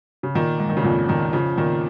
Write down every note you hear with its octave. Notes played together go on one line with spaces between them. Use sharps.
C#3
A#2 D#3
G#2
D#3
C#3
F2 A#2
A#2 D#3
C#3 F3
A#2 D#3